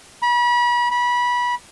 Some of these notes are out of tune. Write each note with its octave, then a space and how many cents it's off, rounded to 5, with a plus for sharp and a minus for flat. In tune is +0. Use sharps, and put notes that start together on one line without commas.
B5 -35
B5 -25